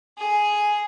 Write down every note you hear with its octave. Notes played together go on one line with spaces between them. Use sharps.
G#4